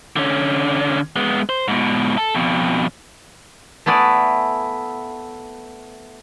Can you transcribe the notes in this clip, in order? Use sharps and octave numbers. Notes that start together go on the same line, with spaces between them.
D3 C#4
G#3 B3
C5
G#2 B2
A4
F2 B2
A3 B3 E4 D5 G#5